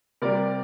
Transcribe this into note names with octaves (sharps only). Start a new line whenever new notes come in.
C3 G3 A#4 D5